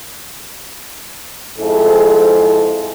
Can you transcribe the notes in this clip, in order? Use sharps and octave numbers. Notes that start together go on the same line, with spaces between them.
F2 G#2 E4 G#4 A4